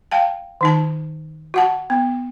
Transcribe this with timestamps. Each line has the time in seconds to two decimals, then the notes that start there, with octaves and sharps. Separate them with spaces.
0.11 F5 G5 A5
0.61 D#3 D#4 A5
1.54 F#4 F#5 A5
1.90 B3